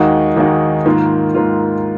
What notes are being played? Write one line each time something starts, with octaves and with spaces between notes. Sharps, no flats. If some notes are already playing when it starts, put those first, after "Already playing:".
Already playing: D#2 D#3 G#3 D#4 F#4
D#2 D#3 G#3 D#4 F#4
G#2 D#3 A#3 F4
G#2 D#3 A#3 F4